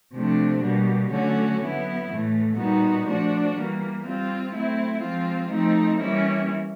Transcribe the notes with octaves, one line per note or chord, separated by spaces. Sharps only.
C3 F3 A3 D4
B2 G3 A#3
D3 F#3 A3 C#4 F#4
F#3 B3 E4
A2 E3 A3
A#2 G3 B3 D#4 F#4
F3 A3 D4 F#4
E3 G3 A#3
G3 C4 F4
F#3 A3 C4 E4
F3 G#3 C4 F4
F3 A3 C4 D#4
E3 G3 A#3 C#4 E4